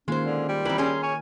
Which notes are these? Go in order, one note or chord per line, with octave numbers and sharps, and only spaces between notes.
D#3 G#3 A#3 C#4 F4 C5
D3
G3
E3 C4 A#4 B5
C#4 G#4 C6
C#5 G#5